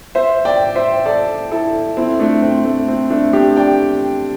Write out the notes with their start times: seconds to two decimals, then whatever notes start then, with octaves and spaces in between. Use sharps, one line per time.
0.15 C5 E5
0.45 D5 G5
0.75 C5 E5
1.06 A4 D5
1.51 E4 A4
1.97 C4 E4
2.19 A3 D4
2.42 C4
2.65 A3
2.88 C4
3.10 A3 D4
3.33 D4 G4
3.56 D5 G5